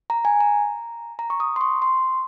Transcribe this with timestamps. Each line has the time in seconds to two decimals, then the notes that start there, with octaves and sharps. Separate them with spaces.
0.10 A#5
0.25 G#5
0.40 A#5
1.19 A#5
1.30 C#6
1.40 D#6
1.56 C6
1.61 C#6
1.82 C6